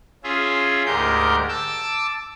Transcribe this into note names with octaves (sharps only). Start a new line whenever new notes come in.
C#4 F4 G#4 E5
D2 G#2 G4 A#4 G6
A5 D6 E6